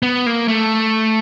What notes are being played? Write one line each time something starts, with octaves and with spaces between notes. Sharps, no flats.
B3
A#3
A3